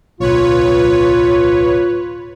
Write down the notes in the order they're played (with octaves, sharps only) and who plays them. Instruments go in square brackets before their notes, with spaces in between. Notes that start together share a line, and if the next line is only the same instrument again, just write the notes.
[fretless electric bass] D1 B1 [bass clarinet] F4 [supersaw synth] B4 C#5